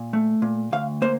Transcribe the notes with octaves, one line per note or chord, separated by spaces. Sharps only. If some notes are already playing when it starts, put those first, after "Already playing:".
Already playing: A#2
A3
A#2
D2 F5
A#3 C5